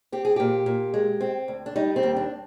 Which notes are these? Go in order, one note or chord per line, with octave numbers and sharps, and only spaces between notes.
C4 G4
G#4
A#2 G4
A#2
G#3
C4
D2
D4
G3 D#4
C4
D#2
D4